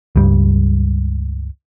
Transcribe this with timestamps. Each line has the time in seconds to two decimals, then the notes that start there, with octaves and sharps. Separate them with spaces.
0.16 C#2 G2 G3